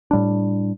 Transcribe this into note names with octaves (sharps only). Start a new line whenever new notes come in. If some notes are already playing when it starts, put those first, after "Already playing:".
A2 G3 D4